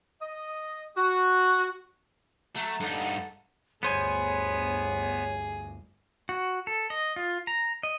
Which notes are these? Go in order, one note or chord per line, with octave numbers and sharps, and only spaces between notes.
D#5
F#4
F#3 A3
G2 D#4 A4 F#5
G1 D2 B3 G#4 C5 C#5 G#5
F#4
A4
D#5
F4
A#5
D#5